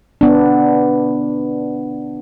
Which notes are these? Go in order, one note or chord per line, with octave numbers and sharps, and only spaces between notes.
B3 D4